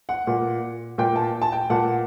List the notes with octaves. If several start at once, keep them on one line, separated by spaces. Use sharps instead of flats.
F#5
A#2
A#2 G5
A5
A5
G5
A#2 F#5